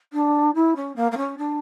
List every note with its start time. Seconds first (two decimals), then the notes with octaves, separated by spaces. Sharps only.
0.13 D4
0.55 E4
0.76 C#4
0.96 A#3
1.12 A#3
1.17 C#4
1.38 D4